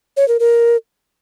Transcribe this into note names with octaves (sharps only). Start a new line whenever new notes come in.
C#5
A#4
A#4